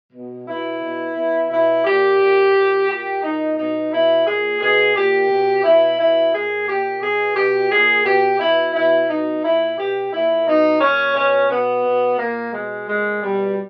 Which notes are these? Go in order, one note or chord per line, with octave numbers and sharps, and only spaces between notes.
B2
B2 E4
B2
B2
B2 E4
A#2 G4
A#2
A#2
A#2 G4
A#2 D#4
B2 D#4
B2 E4
A#2 G#4
B2 G#4
A#2 G4
B2
B2 E4
B2 E4
A#2 G#4
A#2 G4
B2 G#4
B2 G4
A#2 G#4
B2 G4
B2 E4
B2 E4
B2 D#4
A#2 E4
B2 G4
A#2 E4
B2 D#4
A#2 C#4
B2 C#4
B2 B3
B2
A#2 A#3
B2 G#3
A#2 G#3
B2 G3